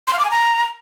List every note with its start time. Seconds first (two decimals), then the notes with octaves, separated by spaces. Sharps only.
0.08 C6
0.13 F5
0.19 D6
0.25 G#5
0.31 A#5